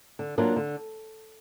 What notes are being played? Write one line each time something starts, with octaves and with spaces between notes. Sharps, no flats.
D3
F#3 A#3 D4 F4
D3